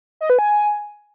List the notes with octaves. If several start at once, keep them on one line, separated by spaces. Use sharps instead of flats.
D#5
B4
G#5